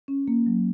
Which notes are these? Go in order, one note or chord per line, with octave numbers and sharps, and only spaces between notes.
C#4
A#3
F#3